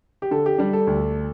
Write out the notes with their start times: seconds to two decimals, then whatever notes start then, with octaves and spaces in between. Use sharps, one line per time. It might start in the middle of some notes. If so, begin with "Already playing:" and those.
0.22 G4
0.31 D3 A4
0.46 G4
0.58 G3 D4
0.73 A4
0.87 D2